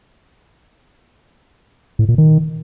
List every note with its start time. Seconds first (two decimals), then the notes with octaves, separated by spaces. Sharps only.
1.99 A2
2.09 A#2
2.18 D#3